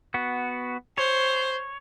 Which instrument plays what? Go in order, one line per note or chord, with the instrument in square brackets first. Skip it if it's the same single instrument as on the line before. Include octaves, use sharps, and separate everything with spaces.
[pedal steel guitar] B3 F#4
[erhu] C5 [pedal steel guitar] C#5